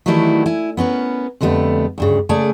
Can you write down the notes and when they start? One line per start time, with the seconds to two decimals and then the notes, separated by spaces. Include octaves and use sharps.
0.06 D#3 E3 F#3 G3 A3 E4
0.46 E4 G#5
0.77 B3 C#4 A#4 B4
1.41 F2 D3 G3 A3 B3
1.98 D2 G2 C#3
2.29 C#3 A3 A#3 G#4 D5 G#5